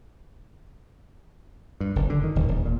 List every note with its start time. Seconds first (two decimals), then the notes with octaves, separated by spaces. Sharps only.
1.80 G2
1.96 F#1
2.10 D3
2.24 D#3
2.36 E1
2.48 D#1
2.65 A#2